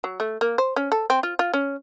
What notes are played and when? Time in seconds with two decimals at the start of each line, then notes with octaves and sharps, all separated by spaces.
0.04 F#3
0.20 A3
0.41 A#3
0.58 C5
0.76 C#4
0.92 A4
1.10 C4
1.23 F4
1.39 F4
1.54 C#4